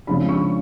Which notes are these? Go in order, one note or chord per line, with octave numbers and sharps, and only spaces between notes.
F2 C#3 F3 G#3 D4 B5
C#6